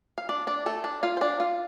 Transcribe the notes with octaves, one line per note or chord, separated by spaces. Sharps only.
F5
D4 D5
D4 D5
A3 A4
D4 D5
F4 F5
C5
D4 D5
F4 F5